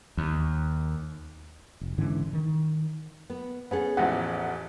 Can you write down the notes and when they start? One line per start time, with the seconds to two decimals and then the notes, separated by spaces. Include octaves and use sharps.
0.17 D#2
1.81 F1
1.98 G#2 D3 E3 C#4
2.33 D#3
3.30 B3
3.71 B3 C#4 G#4 A4
3.97 A1 E2 F3 F#5